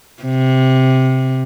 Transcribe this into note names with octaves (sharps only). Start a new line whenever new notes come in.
C3